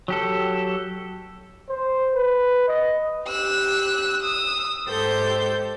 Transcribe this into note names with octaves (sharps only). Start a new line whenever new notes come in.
F#3 G4 A4
C5
B4
D#5
G4 E6 F#6
D#6 E6
G#2 G4 A4 C5 G6